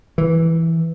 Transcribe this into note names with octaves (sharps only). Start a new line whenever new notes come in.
E3